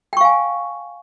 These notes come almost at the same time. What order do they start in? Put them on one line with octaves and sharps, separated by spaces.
G5 C#6 F5 G#5